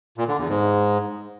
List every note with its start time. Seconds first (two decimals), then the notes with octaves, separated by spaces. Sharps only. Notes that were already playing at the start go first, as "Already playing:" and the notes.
0.18 A#2
0.28 D3
0.38 E2
0.48 G#2